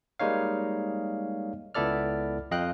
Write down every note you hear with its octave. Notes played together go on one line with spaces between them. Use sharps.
G3 G#3 A#3 D#4 C#5 F5
C#2 B3 E4 A4 D5 F6
F2 D#5 F5 G5 F#6